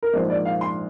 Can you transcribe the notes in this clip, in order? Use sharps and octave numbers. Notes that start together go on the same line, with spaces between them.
A#4
A#1 G#2 F3 A#3 C5
D5
F5
C6